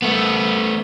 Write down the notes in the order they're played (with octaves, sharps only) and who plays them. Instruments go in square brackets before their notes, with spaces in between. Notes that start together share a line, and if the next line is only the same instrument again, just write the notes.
[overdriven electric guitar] A3 B3